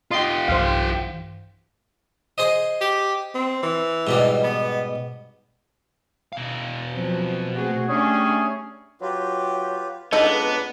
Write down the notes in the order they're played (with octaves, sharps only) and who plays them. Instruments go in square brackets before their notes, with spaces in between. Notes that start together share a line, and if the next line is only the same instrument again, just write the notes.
[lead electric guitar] F4 G4 [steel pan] D#5 C6
[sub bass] B1 [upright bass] G2 E3 [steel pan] C5 F5
[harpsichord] G#4 C5 D#5
[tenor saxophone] G4
C4
E3
[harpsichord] G#2 B2 G3
[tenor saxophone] B3
[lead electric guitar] B2 F5
[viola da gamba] F3 F#3 C4
[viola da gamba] A3 C4 G#4 [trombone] F#4
[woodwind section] G3 A3 G#4 [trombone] C#4 [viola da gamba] D4
[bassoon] F#3 [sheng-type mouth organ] F4 G4 B4
[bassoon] C#2 [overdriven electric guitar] B3 [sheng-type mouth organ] D4 A#5 [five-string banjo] D#4 A4 D#5